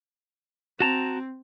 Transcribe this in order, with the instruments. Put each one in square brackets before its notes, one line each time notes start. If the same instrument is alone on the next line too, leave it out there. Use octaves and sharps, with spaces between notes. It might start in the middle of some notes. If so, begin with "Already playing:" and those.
[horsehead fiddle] C4 [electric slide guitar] F#4 A5 A#5